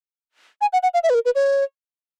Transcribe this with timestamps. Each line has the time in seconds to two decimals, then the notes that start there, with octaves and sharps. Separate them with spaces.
0.61 G#5
0.73 F#5
0.83 F#5
0.94 F5
1.03 E5
1.10 B4
1.14 A#4
1.25 B4
1.35 C#5